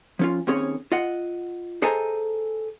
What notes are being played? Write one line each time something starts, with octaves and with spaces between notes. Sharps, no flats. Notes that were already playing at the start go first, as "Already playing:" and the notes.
F3 C#4 F4
D#2 C4 C#4 G#4 C#5
F4 D#5 F#5
G#4 A4 C5 D#5 G#5 A#5